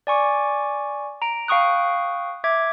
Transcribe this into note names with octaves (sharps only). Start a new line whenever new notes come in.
D5 G#5 C#6 D6
A#5 D7
F5 G5 C#6 D#6 F#6
E5 D6 G#6